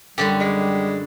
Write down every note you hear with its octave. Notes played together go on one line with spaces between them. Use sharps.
F#2 D3 G3 D4 G4
G#3